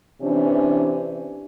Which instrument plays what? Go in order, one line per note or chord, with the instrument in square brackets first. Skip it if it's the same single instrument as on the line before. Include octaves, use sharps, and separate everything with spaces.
[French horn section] C3 E3 C#4 D4